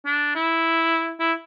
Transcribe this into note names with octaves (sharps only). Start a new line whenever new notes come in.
D4
E4
E4